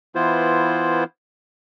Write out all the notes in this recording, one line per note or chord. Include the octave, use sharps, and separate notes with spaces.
E3 B3 E4 F4 C5